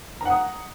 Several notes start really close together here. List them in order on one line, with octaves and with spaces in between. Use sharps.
A#5 F#5 D#6